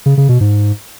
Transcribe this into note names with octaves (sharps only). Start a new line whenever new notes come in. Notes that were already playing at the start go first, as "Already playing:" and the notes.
C#3
C#3
B2
G#2